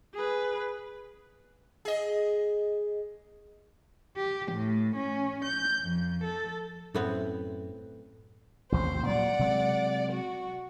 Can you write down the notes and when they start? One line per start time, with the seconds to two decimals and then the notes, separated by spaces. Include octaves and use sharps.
0.14 G#4 B4
1.85 G#4 D#5
4.17 G4
4.51 A2
4.95 C#4
5.44 G6
5.81 F2
6.24 A4
6.95 F#2 A2 B3 C4
8.72 A1 D#2 C3 C5
9.07 A#2 F#3 G3 D5 F#5
9.39 C3 F#3 G#3
10.11 F#4